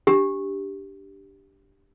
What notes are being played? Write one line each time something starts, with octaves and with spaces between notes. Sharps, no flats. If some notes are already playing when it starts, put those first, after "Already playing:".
D4 G4